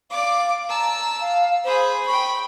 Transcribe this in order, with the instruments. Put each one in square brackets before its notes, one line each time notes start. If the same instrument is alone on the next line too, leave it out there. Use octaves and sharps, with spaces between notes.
[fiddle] D5 D6 [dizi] F5
[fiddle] A5 E6 [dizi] A#5
[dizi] F5
[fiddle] G#4 B5 [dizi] C5
[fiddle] G5 B5 [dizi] C#6